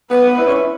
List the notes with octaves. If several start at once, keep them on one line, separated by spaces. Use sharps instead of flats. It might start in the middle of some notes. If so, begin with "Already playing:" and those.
B3 B4
E4
C#4
E4